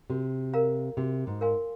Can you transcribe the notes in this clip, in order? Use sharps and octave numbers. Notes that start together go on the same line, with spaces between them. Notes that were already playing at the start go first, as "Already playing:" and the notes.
C3 F#4
A#4 F5 A#5
C3 F#4
G#2
A#4 F5 G#5 C6